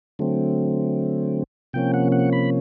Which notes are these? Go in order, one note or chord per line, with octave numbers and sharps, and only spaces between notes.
D3 F#3 A3 C4
C3 F3 A#3 C#4 G5
F#5
F#5
B5